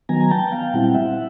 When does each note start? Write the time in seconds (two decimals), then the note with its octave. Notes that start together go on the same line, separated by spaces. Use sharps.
0.09 D#3 F#3 B3 G#5 A#5
0.20 G#5
0.31 G5 A5
0.52 F5 G5
0.74 A#2 G3 C4 E4 F#5
0.84 G5
0.94 E5 F#5